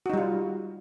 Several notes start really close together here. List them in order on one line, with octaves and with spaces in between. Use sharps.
F#4 D#4 G3 F4